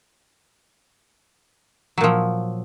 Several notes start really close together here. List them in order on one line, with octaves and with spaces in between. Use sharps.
F#3 A#2 F3